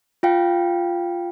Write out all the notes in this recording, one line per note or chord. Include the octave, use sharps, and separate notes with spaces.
F4 F5 G5